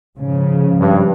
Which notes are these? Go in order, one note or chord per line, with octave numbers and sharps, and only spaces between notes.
G#2 C#3 F3
G2